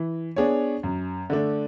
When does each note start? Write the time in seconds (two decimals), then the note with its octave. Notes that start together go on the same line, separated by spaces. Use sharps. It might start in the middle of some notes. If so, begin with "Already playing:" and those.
Already playing: E3
0.36 B3 D4 G#4 C#5
0.83 F#2
1.30 D3 A3 D4